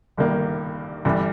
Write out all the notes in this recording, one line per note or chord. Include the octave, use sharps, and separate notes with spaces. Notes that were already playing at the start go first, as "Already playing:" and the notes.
G1 G2 D#3 A#3
G1 G2 E3 G3